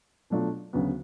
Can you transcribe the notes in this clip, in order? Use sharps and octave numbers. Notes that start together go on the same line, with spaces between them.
B2 F#3 A3 D4 F4
D2 C#3 F#3 B3